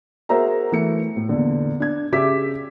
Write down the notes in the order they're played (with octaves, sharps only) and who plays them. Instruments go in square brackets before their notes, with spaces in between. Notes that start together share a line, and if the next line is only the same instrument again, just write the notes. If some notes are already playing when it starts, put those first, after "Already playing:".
[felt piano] F#4 G#4 A#4 C5 E5 A#5
E3 A3 E5 C#7
A2
E2 A#2 D3
D4 G#6
C#3 G4 E5 D6 B6